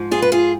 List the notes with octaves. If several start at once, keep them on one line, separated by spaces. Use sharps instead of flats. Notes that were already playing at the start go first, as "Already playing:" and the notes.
Already playing: G#2 F3
F4 G#4
B4
F4 G#4